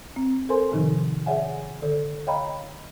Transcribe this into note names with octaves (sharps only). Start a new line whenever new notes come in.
C4
A4 A#4 C5 G#5 C6
A2 C3 D#3 F3 D#4
G#4 C#5 D5 E5 F#5 G#5
D3 A4 D5
C#5 D#5 F5 G5 A#5 B5